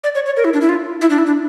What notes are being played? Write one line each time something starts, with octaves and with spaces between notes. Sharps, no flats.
D5
C#5
C#5
A#4
E4
D4
E4
F4
E4
D4
E4
D4